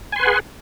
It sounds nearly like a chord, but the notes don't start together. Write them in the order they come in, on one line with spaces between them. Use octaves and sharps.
G#5 C6 B4 F#5 G#4